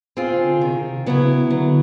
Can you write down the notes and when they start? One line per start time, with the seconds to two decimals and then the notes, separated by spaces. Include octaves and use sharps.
0.17 C4 F4 G#4
0.32 D3
0.61 C3 D#3
1.06 C#3 F#3 B3 E4
1.51 D3 F#3